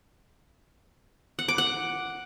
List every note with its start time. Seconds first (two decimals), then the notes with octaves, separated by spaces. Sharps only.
1.39 F#5
1.48 D6
1.58 F#5